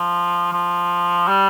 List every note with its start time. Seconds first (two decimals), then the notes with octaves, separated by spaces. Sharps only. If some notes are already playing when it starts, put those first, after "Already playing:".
Already playing: F3
0.53 F3
1.28 G3